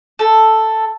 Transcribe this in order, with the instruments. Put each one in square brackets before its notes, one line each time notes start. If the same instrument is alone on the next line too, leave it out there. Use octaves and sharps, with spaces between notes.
[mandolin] A4